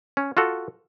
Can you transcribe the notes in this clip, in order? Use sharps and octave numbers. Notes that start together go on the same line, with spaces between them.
C#4
F4 F#4 A4